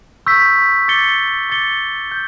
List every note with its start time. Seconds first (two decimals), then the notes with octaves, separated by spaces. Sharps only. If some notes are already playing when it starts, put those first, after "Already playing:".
0.27 C#6 E6 G6 B6
0.88 D6 A6 C#7 G7
1.50 D6 A6 C#7 G7
2.12 G6